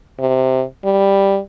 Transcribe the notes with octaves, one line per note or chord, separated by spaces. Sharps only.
C3
G3